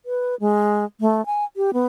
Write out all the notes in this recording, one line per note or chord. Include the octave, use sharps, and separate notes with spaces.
B4
G#3
A3
G#5
G4
B3